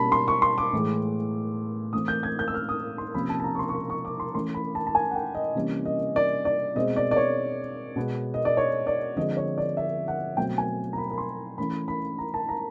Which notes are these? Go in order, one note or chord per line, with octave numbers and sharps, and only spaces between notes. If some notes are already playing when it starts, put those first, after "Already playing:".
Already playing: B2 G3 A#3 C#4 A5 B5
C6
C#6
C6
D6
A2 E3 G#3
E3 A3 C4 D#6
G6
G#6
G6
E6
F6
D#6
C6
C3 F3 A#3 C#4 B5
A5
A5
A#5
C#6
C6
C#6
C6
C#6
D6
C6
E3 A3 C#4 C6
B5
A5
A5
G#5
F#5
G5
D#5
C3 E3 G3 A#3 C#4
D#5
D5
D5
B2 G#3 C4 D#5
D5
D5
C#5
B2 G#3 B3
D#5
D5
C#5
D5
D3 F3 G#3 C4 D#5
C#5
D5
E5
F#5
B2 F#3 A3 C4 G5
G#5
A#5
B5
B5
C6
E3 A3 C#4 B5
B5
A#5
A5
A#5